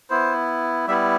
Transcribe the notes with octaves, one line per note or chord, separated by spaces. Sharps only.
B3 E4 C5
G3 B3 E4 E5